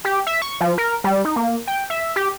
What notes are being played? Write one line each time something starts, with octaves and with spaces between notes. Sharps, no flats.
G4
E5
C#6
F3
A#4
G3
D#4
A#3
G5
E5
G4